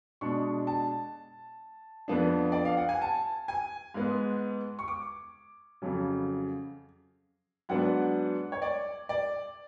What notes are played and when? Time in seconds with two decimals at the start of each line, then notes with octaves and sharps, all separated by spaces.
0.21 B2 G#3 D4 C#6
0.67 A5
2.08 F2 F3 B3 D4
2.52 D5
2.65 F5
2.77 F#5
2.89 G#5
3.02 A5
3.48 G#5
3.94 G#2 G#3 B3
4.79 C#6
4.88 D6
5.82 F2 C#3 F#3 C#4
7.69 G#2 F#3 B3 D4 F#5
8.52 C#5
8.62 D5
9.09 D5